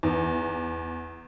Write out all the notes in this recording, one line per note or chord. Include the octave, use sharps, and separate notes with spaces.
E2